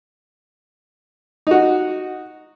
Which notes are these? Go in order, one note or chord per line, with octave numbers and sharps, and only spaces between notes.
D#4 F#4